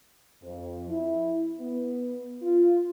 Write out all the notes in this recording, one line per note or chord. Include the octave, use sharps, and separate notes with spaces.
F2
E4
B3
F4